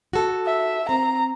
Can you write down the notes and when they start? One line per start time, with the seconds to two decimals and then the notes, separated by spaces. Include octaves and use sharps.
0.13 F#4 A4
0.46 E5
0.89 C4 A#5